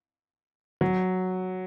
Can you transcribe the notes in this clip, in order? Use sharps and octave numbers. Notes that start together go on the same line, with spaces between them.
F#3